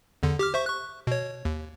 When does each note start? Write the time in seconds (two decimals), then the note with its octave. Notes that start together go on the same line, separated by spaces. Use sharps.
0.23 E2 D3
0.39 G4 D6 F6
0.54 C5 E5 C#6
0.66 C#6 F#6
1.07 B2 C#5
1.45 D#2